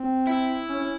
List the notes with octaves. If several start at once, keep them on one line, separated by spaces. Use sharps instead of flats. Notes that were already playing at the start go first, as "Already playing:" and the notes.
Already playing: C4
E4
C#4
C#4